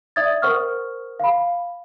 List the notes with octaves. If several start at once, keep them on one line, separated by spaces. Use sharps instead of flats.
D5 E5 D#6 G#6 A6
A#4 C5 F#5 C#6 D#6 F6
F5 B5